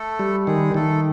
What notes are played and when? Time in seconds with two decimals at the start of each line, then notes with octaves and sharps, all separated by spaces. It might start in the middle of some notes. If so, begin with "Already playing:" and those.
Already playing: A3 A4
0.19 G3
0.47 D#3 G#3 G#4
0.74 D#3 A3 A4